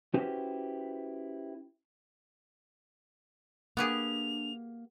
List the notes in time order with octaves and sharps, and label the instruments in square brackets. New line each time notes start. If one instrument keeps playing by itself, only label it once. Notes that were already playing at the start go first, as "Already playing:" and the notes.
[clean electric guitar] C#4 E4 F#4 G4 B4 C5
[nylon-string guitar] A#3 [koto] B3 G4 G#4 [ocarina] D4 [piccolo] F7